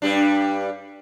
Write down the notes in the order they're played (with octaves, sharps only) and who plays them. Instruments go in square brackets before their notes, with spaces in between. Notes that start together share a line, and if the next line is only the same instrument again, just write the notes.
[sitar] G2 G3 D4